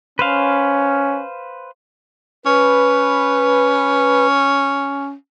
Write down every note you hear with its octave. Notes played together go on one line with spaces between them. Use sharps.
C#4 B4 C5 F5
C#4 B4